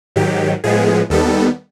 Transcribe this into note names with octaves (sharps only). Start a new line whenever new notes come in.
G#2 D#3 F#3 G4
A2 F3 G#3 B3 G#4
D#2 D#3 G3 B3 A4